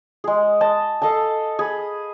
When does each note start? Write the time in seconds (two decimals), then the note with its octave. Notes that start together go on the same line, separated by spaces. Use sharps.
0.24 G#3 G#4
0.61 D#5 A5
1.02 A4 D#5 F5 A5
1.59 G#4 B5